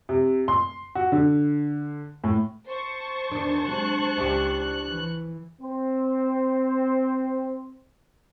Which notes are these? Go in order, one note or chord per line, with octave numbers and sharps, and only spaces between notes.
C3
C6
F#4
D3
A2
C5 A5 C#6
E2 D#3 D4
C3 F#3 G#3 F#6
C#2 D4 E4 G4
E3
C4 C5